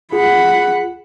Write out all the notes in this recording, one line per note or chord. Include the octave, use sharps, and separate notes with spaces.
F4 G#4 F#5 B5